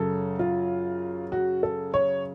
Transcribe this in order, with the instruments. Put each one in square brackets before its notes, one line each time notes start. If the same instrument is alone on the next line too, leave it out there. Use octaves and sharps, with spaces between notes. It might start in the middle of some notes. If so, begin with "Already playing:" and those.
Already playing: [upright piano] F#2 C#3 A4
F4
F#4
A4
C#5